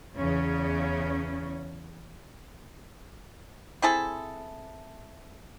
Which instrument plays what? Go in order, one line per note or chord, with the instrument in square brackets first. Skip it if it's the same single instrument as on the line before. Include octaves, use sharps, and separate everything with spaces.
[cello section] E2 C#3 C#4
[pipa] C4 E4 G#4 A4